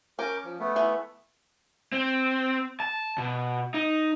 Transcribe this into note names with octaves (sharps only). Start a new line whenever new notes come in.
C#4 A#4 D6 G6
F3
A3 B3
E3
C4
A5
B2
D#4